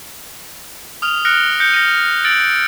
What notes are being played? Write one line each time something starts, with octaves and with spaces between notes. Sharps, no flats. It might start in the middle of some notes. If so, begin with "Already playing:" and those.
D#6 F6 F7
F6 F#6 A#6 C#7 D7
G6 A#6 C#7
A#6 D#7
E6 A6 D7 F#7